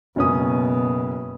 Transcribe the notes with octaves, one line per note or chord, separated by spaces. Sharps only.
F#1 B2 C#4 D#6